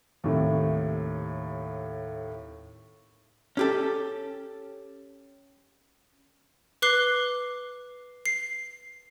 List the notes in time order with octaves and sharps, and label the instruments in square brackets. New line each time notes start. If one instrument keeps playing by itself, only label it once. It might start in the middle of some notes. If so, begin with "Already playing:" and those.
[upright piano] D#2 A2 C3
[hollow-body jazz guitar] C#4 G4 A4
[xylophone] B4 D6 F#6 C7 G7
C7